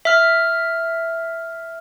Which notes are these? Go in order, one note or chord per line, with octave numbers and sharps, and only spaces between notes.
E5 F6